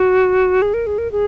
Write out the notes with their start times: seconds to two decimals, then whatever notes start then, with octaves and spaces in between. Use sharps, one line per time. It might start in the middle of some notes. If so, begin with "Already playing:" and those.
Already playing: F#4
0.62 G#4
0.74 A#4
0.87 G#4
0.98 A#4
1.12 G#4